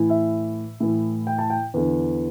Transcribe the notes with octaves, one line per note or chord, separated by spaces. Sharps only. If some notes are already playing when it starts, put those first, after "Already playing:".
Already playing: A2 E3
E5
A2 E3
G5
A5
G5
E2 D3